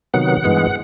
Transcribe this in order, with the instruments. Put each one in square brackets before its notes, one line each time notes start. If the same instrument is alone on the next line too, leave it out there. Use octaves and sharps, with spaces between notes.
[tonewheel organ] C3 D#3 F#3 B3 F#5
G2 E3 G#3 B3